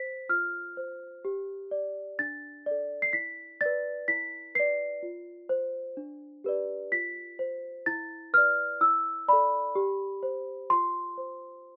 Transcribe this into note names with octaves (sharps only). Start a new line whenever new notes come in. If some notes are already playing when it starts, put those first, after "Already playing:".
Already playing: C5 B6
F4 F6
C5
G4
D5
D4 A6
A4 D5
C7
E4 B6
B4 D5 A6
E4 B6
B4 D5 C7
F4
C5
D4
G4 B4 D5
F4 B6
C5
E4 A6
B4 D5 F6
E4 E6
A4 D5 B5
G4
C5
F4 C6
C5